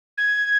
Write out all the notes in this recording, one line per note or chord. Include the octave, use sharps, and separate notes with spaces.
G#6